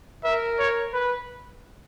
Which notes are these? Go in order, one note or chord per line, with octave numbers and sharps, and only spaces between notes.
A#4 E5
C#5
B4